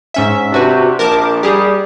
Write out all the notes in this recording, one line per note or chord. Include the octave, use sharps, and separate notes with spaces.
G#2 C#4 E5
C3 D4 F#4 B4
A#1 A#4 A5 D6
G3 G4 G#4